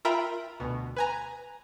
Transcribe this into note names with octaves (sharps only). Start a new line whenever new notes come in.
F4 A#4 E5 G5 A#5 B5
D2 B2
B4 G#5 A#5